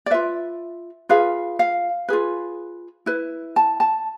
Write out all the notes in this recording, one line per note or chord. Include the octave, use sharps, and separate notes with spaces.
D5
F4 B4 E5
F4 G#4 B4 F5
F5
F4 G#4 B4
E4 B4
A5
A5